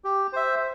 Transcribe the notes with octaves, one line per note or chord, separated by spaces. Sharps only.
G4
C5 E5